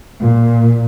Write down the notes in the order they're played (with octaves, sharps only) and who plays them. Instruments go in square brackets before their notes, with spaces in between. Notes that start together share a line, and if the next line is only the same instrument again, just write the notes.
[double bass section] A#2